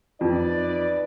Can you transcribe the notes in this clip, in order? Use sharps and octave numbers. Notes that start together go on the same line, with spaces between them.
F2 D#4 B4 D5